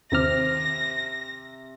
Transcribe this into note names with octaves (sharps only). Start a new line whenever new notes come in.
D#2 C3 C4 D6 F6 A#6